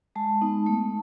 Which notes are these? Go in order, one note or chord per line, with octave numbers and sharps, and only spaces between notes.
G#3 A5
B3 D#4
A3